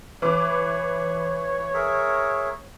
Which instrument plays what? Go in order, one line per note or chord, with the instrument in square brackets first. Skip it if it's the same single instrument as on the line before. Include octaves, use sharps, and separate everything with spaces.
[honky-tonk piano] E3 B4 D6 [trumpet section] C#5
[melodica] G#4 A#4 E5